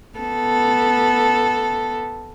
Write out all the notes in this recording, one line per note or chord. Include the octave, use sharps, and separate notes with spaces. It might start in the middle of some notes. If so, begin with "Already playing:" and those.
B3 A4